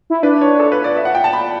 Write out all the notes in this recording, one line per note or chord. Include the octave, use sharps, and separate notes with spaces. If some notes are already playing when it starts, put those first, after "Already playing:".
E4
D4 B4
C#5
A4
B4
D5
E5
F#5
G5
A5
B5